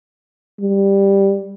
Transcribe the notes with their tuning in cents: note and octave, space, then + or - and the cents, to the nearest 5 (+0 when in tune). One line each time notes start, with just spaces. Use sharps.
G3 +5